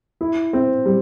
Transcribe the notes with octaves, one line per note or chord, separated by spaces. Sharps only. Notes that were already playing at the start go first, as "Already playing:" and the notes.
E4
C4
G3